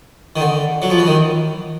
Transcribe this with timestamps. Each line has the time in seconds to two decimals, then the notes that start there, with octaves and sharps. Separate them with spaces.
0.36 D#3
0.40 D3
0.82 F#3
0.90 F3
0.98 E3
1.07 D#3